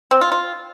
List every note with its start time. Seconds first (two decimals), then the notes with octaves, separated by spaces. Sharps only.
0.11 C4
0.21 F4
0.32 F4